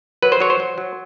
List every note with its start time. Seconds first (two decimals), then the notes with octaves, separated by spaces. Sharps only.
0.22 F#3 B4
0.32 C5
0.40 F#3 C#5
0.50 C5
0.60 F#3
0.78 F#3